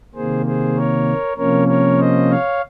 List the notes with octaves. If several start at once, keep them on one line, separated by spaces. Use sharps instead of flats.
C3 D#3 A#3 G#4 C5
G#4 C5
A#4 C#5
C3 F3 A#3 C#4 A#4 C#5
A#4 C#5
C5 D#5
C#5 F5